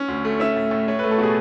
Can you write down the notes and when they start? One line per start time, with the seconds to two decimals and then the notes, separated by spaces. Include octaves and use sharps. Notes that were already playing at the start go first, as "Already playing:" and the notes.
Already playing: C#4
0.08 D2
0.25 A3
0.40 C#4 E5
0.56 A2
0.71 A2
0.88 A3 C#5
0.99 A3 B4
1.11 A4
1.18 B2 G#4